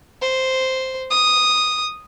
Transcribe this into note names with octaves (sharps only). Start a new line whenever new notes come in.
C5
D#6